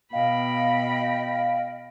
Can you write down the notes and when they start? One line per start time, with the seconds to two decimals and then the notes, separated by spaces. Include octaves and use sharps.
0.13 B2 D#5 F5 G5 B5